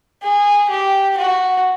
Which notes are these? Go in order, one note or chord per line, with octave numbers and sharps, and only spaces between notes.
G#4
G4
F#4